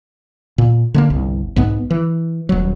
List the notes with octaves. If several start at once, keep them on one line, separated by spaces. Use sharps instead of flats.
A#2
D3 A3 A#3
G1 C2
B1 G#2 B3
E3
D#1 F#3